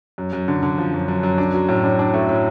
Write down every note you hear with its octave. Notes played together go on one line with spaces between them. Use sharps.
F#2
F#2
D3
D3
F3
F#2
F#2
F#2
D4
F#3
A2
D4
D4
A3
A2